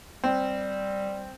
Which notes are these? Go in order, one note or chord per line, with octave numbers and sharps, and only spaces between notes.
G3 C4